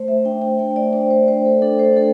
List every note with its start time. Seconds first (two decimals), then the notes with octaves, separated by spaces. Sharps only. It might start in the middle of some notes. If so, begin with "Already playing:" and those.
Already playing: A3 C5
0.08 E5
0.25 D4 G5
0.42 G5
0.59 A3 G5
0.76 D5
0.93 D4 C5
1.10 C5
1.28 A3 C5
1.46 A4
1.62 D4 A4
1.79 C5
1.96 A3 A4